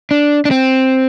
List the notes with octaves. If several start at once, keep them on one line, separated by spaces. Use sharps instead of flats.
D4
D4
C4